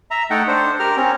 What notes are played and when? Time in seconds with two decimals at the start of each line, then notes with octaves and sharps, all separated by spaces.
0.11 E5 A#5
0.30 A3 D#4 A4 F#5 G5
0.48 D4 C5
0.79 G4 A#4 F6
0.97 C4 C#4